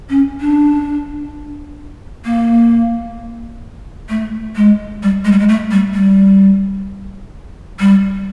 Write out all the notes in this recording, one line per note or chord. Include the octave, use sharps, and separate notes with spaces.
C#4
D4
A#3
A3
G#3
G3
G#3
G3
G#3
A3
G3
G3
G3